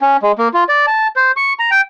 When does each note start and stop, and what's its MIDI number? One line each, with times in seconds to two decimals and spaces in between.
0.01 0.17 61
0.22 0.32 56
0.38 0.48 58
0.54 0.64 65
0.69 0.86 74
0.87 1.08 81
1.16 1.32 72
1.36 1.53 85
1.59 1.71 82
1.71 1.81 79